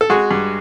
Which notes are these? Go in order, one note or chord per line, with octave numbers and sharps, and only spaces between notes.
A4
G#3 F#4 G#4
G2